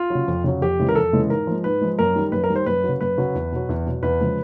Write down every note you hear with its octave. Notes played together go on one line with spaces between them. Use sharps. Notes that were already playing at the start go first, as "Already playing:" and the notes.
Already playing: F4
C#3 F#3
F2
C#3 F#3
F2 G4
C#3 E3 G#3
A#4
F2 A4
C#3 E3 G#3
G#2 A#4
F3 G#3
G#2 B4
F3 G#3
F#2 A#4
D#3 G3
F#2 B4
A#4
D#3 G3
C5
F#2 B4
C#3 F#3
F#2 B4
C#3 F#3
E2
B2 F#3
E2
B2 F#3
E2 B4
C#3 F3 G#3